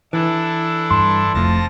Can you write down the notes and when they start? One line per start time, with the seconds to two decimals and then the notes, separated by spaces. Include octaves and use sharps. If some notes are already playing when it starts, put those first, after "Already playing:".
0.13 E3 D4 E4 A4
0.91 G2 C6
1.34 F1 F2 F3 A3 A5 A#6